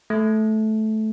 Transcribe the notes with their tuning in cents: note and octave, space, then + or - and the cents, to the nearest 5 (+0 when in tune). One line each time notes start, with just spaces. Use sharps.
A3 -15